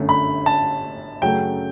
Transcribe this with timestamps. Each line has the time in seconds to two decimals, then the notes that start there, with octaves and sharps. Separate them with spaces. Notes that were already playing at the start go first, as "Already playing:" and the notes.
Already playing: G1 F#2 D3 A3
0.09 B5
0.46 A5
1.22 F#2 C#3 F#3 A3 G5